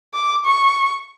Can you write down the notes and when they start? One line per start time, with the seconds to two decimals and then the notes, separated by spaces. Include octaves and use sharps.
0.14 D6
0.46 C#6